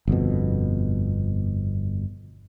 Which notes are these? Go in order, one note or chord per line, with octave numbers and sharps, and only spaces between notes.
G1 F2 B2